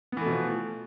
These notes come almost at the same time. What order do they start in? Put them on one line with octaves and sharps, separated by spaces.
B3 E3 A3 B2 F3